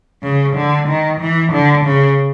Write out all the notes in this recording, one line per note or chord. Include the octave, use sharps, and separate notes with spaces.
C#3
D3
D#3
E3
D3
C#3